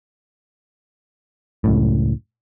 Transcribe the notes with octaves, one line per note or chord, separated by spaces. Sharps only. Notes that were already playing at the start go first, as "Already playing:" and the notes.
C#2 F#2 A2